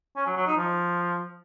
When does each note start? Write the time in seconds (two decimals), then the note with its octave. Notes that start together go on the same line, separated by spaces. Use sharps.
0.16 C#4
0.26 F#3
0.37 F#3
0.47 D#4
0.57 F3